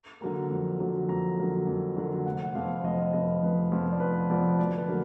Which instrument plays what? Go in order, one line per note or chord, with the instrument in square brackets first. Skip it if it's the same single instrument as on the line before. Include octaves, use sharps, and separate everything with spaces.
[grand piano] D3 F#3 A#3 A#5
F2
D3 F#3 A#3
F2 A#5
D3 F#3 A#3
F2
D3 F#3 A#3
F1 F#5
F#5
F2 F3 B3 F5
F1 D#5
F2 F3 B3 D#5
F1 B4
F2 F3 B3
D5
F1 B4
F2 F3 B3 D5
D2 D5
B4
D3 F#3 A#3 D5